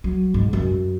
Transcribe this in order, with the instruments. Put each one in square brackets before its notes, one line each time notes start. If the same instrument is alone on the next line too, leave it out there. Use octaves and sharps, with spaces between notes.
[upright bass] F#3
G#2
F#2